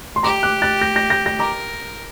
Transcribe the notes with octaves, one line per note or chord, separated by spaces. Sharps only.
C6
G4 A#5 D6
D6 F#6
F#6 A6
G6 A#6
G6 A#6
G6 A#6
G6 A#6
A#4 A#5 D6